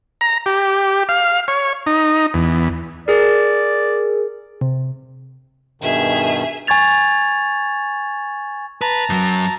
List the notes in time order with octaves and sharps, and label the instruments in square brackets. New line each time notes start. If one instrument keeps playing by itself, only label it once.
[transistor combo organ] A#5
G4
F5
C#5
D#4
E2
[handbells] G#4 A#4 [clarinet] D5
[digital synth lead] C3
[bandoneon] G2 B2 D#3 [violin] G#4 E5
[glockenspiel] G#5 C#6 G#6 A6 F7
[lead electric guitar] B4 [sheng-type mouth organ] A5 A#5
[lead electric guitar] F#2 F#3